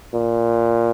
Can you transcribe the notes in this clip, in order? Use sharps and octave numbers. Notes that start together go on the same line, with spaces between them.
A#2